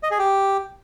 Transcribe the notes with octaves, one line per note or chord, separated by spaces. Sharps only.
D#5
G#4
G4